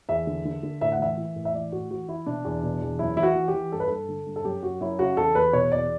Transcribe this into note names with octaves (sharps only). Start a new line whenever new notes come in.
E2 E5
D3
D3
D3
A2 E5
F#5
E3 E5
E3
A2
E5
E3 D5
A2 F#4
E3 F#4
E3 E4
B2 D4
E2
B2
E2
F#2 E4
E3 E4
F#4
E3
G4
E3
G2 A4
B4
G2 A4
D3
G2
A4
F#2 G4
F#2 F#4
F#2 E4
C#3 F#4
E2 A4
E2 B4
B2 C#5
E2 D5